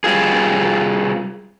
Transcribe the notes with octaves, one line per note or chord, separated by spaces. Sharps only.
G3 F4 G#4